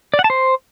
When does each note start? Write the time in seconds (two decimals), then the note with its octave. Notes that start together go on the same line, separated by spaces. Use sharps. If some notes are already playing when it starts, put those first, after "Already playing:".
0.14 D5
0.19 F#5
0.24 A5
0.30 C5